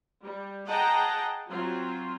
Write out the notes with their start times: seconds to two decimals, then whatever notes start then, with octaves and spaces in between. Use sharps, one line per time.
0.22 G3
0.69 G#4 D#5 F#5 G5 A5 A#5
1.49 F#3 C4 F4